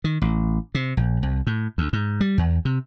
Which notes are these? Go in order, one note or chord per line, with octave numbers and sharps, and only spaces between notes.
D#3
A1
C3
A#1
C2
A2
D2
G#2
G3
E2
C3